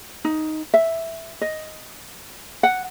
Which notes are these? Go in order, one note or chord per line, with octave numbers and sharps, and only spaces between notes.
D#4
E5
D#5
F#5